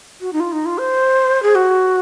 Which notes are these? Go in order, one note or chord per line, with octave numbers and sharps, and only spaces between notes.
F#4
D#4
F4
D#4
F4
C5
G#4
F#4